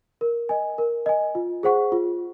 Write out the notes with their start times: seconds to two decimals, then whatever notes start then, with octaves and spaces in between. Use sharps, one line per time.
0.21 A#4
0.49 D#5 G#5
0.78 A#4
1.06 D#5 G#5
1.35 F4
1.63 G#4 C5 F#5 C#6
1.92 F4